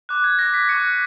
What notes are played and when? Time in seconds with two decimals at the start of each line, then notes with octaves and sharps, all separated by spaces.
0.09 D6 F#6
0.24 G#6
0.39 A#6
0.54 B6
0.69 C#6 F#6 C#7